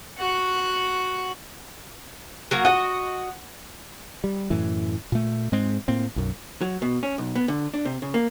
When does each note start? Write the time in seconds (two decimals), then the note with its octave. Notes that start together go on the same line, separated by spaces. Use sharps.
0.18 F#4 F#5
2.51 F#3 A#3 F#4
2.65 F#4 D#5 F#5
4.24 G3
4.50 F#2 A2 E3
5.12 A#2 A3
5.52 G#2 G#3 C4
5.88 A2 A#3 C4
6.16 B1 F#2
6.61 F#3
6.82 B2
7.03 C#4
7.18 B1
7.36 B3
7.48 D3
7.74 D4
7.85 C3
8.02 C#3
8.14 A#3